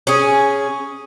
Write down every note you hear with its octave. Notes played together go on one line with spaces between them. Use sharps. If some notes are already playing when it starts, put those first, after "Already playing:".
C#4 G#4